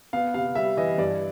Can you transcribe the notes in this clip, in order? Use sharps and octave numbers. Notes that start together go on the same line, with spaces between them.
B3 F5
C3 F5
G3 E5
E3 D#5
G2 D5